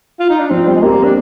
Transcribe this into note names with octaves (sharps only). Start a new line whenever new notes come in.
F4
D#4
D4
F3 C4
G3
G#3
A#3 C4 G4 A#4
D4